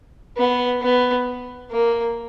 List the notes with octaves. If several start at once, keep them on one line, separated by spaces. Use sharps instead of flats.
B3
B3
A#3